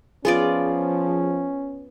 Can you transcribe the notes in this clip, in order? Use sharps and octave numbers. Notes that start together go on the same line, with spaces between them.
F3 B3 C#4 F4 G#4 D5